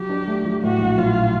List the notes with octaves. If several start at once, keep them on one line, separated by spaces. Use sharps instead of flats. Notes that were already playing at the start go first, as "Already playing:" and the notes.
Already playing: F#3 G4
D4
A3
F#3
A2 F#4
A#1
F#3 F4